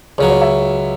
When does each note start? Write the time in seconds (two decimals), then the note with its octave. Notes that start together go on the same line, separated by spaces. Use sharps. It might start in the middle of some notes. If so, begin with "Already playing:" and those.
0.18 C#2 C#3 F#3 C#5
0.30 C#5
0.41 E5